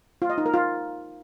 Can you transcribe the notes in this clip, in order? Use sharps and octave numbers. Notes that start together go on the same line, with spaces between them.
F4
D#5
D#4
A#4
F4